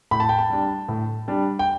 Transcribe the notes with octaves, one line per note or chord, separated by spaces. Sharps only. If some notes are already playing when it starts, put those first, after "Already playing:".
A2 B5
A5
G5
A5
G3 D4
A2
G3 D4
G5